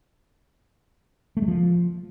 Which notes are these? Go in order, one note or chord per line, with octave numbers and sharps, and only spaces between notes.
A3
G#3
F3